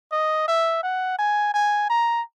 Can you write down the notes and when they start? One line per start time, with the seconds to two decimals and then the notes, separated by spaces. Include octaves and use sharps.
0.12 D#5
0.48 E5
0.83 F#5
1.19 G#5
1.54 G#5
1.90 A#5